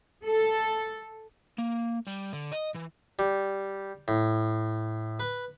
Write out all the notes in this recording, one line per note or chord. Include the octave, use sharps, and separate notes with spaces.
A4
A#3
G3
D3
D#5
E3
G3
A2
B4